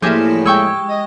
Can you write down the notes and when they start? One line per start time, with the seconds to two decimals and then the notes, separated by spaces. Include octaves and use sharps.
0.02 E2 A2 F3 A#3 E4 G4 G#4
0.46 G#3 G5 C#6 E6
0.88 D#5